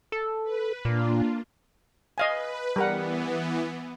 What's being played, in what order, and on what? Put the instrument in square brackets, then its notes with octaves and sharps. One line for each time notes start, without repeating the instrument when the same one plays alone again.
[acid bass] A4
[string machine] B4
[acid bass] A#2 [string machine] A#3 D4 F4
[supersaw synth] B4 [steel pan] D#5 F5 G#5
[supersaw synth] E3 B3 [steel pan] G3 A#4 F#5